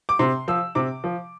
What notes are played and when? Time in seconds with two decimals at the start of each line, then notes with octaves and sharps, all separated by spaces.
0.09 D6
0.19 C3 C6
0.48 F3 E6
0.75 C3 D6
1.04 F3